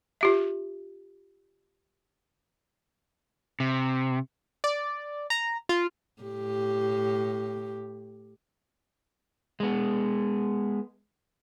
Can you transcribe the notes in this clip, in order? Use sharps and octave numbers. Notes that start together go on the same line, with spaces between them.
F4 G4 E5
C3
D5
A#5
F4
A2 G4
G#3 B3